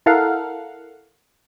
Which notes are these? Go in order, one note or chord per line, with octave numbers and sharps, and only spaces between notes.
E4 A4 A#4 F5 F#5